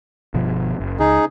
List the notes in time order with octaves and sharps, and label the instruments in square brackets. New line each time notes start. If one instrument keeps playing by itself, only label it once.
[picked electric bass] G1 B2 F3
F#1
[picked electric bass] C#2 [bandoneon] D#4 G#4